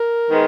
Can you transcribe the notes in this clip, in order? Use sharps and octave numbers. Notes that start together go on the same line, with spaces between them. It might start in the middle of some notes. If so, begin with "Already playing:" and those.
Already playing: A#4
D#3 G#3 B3